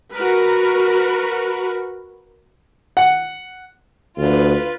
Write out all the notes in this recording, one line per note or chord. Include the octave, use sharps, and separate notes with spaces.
F#4 A#4 B4
F#5
D2 F4 B4